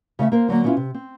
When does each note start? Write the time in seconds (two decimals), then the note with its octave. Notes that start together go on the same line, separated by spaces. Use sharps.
0.19 C#3 A3 D#5 E5
0.32 A#3 A#4 C5
0.48 D3 F#3 A3 A#3
0.64 B3 C#4 D4 E4 F4
0.77 C3
0.94 C4